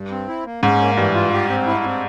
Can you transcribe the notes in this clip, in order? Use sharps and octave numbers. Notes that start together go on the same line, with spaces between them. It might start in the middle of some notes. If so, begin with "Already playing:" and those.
Already playing: G2
C4
E4
A#3
G#2 C#4
A#3
G2 E3
F4
G4
C4
E4
C4